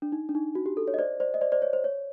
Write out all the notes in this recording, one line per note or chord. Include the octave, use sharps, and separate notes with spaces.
D4
D#4
D4
D#4
F#4
G4
A4
C#5
D#5
C5 D5
C5 D5
D#5
C5 D5
C5 D5
C#5
C5
C#5